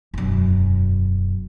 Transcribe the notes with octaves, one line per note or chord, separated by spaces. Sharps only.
E1 F#2